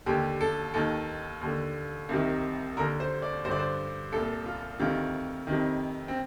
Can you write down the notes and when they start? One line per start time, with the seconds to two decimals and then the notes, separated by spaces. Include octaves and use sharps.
0.06 D#2 D3 G4
0.41 A4
0.74 D#2 D#3 A4
1.41 D#2 D3
2.09 C2 C3 D#3
2.77 D#2 D3 A#4
3.00 C5
3.22 D5
3.44 G2 C5
3.49 D3 D5
3.59 C5
4.12 C2 A#2 A4
4.46 F4
4.79 D2 C3 D#3 F4
5.47 F2 C3 D#3
6.08 C4